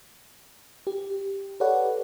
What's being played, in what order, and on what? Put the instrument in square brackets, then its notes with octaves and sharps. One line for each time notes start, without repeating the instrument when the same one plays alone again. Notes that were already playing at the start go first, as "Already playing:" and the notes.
[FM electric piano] G4
G4 A4 B4 C#5 D5 F#5